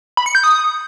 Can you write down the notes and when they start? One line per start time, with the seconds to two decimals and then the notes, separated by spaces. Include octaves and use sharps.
0.17 B5
0.26 C#7
0.35 G6
0.44 D#6